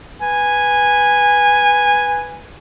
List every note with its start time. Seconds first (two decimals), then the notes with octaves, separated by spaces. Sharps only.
0.21 B4 G#5